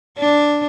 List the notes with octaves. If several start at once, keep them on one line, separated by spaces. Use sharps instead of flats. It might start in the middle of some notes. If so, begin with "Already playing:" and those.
D4